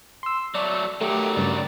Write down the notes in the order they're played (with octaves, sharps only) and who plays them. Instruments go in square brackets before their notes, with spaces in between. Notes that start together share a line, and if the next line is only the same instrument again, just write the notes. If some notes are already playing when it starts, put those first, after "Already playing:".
[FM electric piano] C6 E6
[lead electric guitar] F#3 A3 [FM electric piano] D5
[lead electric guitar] D#3 F#3 [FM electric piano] A3 [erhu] G4
[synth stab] G2 C#3 G3 [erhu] D5